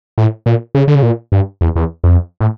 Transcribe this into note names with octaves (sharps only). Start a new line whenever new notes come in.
A2
A#2
C#3
D3
C#3
A#2
G2
E2
E2
F2
A2